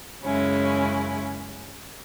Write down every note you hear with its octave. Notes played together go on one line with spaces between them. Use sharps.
F#2 C#3 G#3 C#4 E4